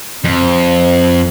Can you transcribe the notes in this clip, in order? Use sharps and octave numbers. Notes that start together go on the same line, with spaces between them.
F2 C4